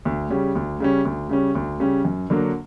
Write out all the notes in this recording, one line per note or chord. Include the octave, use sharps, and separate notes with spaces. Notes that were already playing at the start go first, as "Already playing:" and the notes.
D2
C#3 G3 C#4
D2
C#3 G3 C#4
D2
C#3 G3 C#4
D2
C#3 G3 C#4
F#2
D3 F#3 A#3